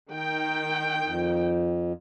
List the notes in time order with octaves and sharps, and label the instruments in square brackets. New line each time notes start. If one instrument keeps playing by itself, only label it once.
[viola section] D#3 G5
[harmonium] F2